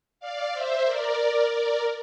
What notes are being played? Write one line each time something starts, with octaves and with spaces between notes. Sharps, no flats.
D5 F5
C5 E5
A#4 D5
A#4 D5